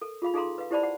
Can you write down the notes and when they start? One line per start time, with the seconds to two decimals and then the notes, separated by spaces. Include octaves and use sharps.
0.01 A4 A#4
0.22 F4 G#4 F5 B5
0.34 D#4 G#4 A4 F5 A#5 C6
0.58 B4 F5
0.71 E4 G4 C5 D5 A5 B5
0.83 F#5